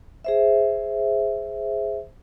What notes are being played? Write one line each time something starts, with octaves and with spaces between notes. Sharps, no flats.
G#4 C5 E5